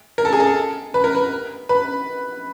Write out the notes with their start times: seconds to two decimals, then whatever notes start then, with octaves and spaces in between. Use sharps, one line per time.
0.18 A#4
0.25 A4
0.33 G#4
0.40 A4
0.94 B4
1.04 A#4
1.15 B4
1.69 B4